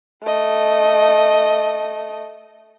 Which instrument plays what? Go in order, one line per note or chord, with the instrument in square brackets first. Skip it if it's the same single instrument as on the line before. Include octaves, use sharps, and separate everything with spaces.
[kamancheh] A3 D#5